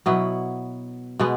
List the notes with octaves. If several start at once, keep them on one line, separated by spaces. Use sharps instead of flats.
B2 F#3 B3 E4
B2 G#3 B3